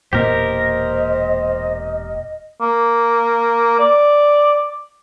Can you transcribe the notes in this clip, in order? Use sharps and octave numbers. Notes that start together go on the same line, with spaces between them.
E1 A#2 A#3 G4 A#4 C5 D#5
A#3
D5